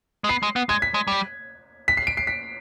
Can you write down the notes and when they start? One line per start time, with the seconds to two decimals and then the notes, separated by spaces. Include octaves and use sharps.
0.24 G#3
0.29 B3 C7
0.43 G#3
0.56 B3
0.69 G#3 G#6
0.82 B6
0.94 G#3
1.07 G3
1.88 B6
1.97 C7
2.07 D7
2.17 C7
2.27 B6